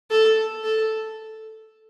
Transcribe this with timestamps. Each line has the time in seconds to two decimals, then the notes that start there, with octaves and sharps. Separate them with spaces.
0.11 A4
0.63 A4